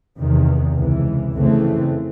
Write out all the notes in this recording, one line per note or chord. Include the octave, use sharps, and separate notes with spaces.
E2 C3 D#3
C#2 C3 E3
F2 C#3 E3 A3 C4